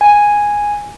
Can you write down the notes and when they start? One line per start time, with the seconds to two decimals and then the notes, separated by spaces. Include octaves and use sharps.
0.01 G#5